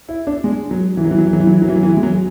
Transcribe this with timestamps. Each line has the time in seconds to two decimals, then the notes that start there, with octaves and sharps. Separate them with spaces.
0.09 E4
0.27 D4
0.44 G#3
0.71 F#3
0.97 E3
1.04 F#3
1.11 E3
1.18 F#3
1.26 E3
1.33 F#3
1.40 E3
1.47 F#3
1.54 E3
1.62 F#3
1.69 E3
1.76 F#3
1.83 E3
1.97 G#3
2.03 F#3